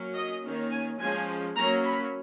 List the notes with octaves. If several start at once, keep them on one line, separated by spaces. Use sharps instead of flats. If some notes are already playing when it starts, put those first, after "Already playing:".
Already playing: F#3 A#3 C#4
D#5
D#3 A#3 C#4
G#5
F3 G#3 C#4 G#5
F#3 A#3 C#4 A#5
B5